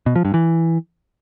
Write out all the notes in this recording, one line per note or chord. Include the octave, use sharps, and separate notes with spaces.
B2
F3
G2
E3